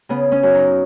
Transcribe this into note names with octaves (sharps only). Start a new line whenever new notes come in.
C#3 B3
C#4
F#2
D#4